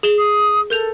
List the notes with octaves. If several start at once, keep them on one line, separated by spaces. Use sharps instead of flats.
G#4 E7 G7
D#6
A4 A#4 G6 F7